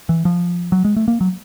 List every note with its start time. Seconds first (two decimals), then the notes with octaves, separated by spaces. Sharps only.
0.09 E3
0.25 F3
0.72 F#3
0.85 G#3
0.96 A3
1.08 A#3
1.21 F#3